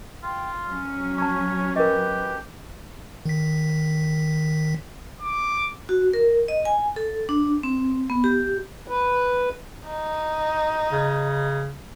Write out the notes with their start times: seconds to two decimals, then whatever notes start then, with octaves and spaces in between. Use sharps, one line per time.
0.23 F4 G5
0.66 F#3 C#4 F6
1.18 C#5 A5 C#6
1.76 G4 A#4 B4 D#5
3.26 D#3 B6
5.22 D6
5.89 F#4
6.13 A#4
6.48 D#5
6.65 G#5
6.96 A4
7.29 D4
7.63 C4
8.10 B3
8.24 G4
8.88 B4
9.88 D#4
10.92 C#3